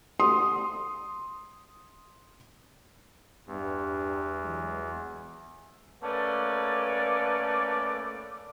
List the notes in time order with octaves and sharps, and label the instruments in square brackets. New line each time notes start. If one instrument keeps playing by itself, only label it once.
[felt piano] C6 D#6
[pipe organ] E2 [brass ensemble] G2
[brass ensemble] E3 F#3 G#3
[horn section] A3 A#3 C#4 B4 D5